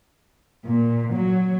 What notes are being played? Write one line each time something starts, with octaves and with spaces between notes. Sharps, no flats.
A#2
F#3